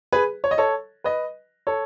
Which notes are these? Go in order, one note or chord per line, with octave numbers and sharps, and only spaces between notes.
G#4 B4
C#5
D#5
A4 C#5
B4 D#5
A4 C#5